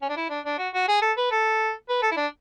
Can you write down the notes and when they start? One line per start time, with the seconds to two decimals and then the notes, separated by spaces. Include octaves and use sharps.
0.02 C#4
0.09 D4
0.17 E4
0.30 D4
0.45 D4
0.59 F#4
0.74 F#4
0.88 G#4
1.02 A4
1.17 B4
1.31 A4
1.89 B4
2.02 A4
2.12 E4
2.17 D4